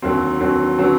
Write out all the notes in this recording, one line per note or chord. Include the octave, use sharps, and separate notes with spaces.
D#2 D3 F#3 C4
D#2 D3 F#3 C4
D3 F#3 C4